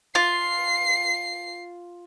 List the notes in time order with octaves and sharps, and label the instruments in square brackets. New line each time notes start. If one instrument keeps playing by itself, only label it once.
[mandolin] F4 [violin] C7